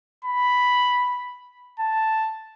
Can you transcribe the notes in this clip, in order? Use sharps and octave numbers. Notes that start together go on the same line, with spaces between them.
B5
A5